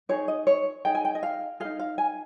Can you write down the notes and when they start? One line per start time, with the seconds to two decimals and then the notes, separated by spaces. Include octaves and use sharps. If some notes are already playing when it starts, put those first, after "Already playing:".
0.09 D#4 G#4 C#5
0.28 D#5
0.47 C#5
0.85 D#4 G#4 G5
0.95 G#5
1.05 G5
1.15 D#5
1.23 F5
1.60 D#4 G#4 F5
1.79 F5
1.98 G#5